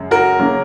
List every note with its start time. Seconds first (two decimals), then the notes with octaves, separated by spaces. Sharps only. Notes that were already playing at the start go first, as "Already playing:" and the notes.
Already playing: F#2 C#3 G#3
0.11 F#4 A#4
0.40 C#3 F#3 A#3